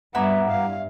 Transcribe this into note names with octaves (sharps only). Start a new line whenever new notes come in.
G2 B3 E4 F#5 A#5 D6
G2 F5